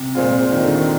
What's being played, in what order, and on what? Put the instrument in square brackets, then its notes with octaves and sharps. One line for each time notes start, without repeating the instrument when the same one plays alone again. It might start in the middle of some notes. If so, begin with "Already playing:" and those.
Already playing: [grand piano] C3
[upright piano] A#2 G#3 C4 F4
[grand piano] D#3
D3
D#3